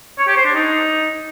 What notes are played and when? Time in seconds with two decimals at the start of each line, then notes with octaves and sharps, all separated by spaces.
0.19 C#5
0.28 G4
0.37 C5
0.46 D4
0.55 D#4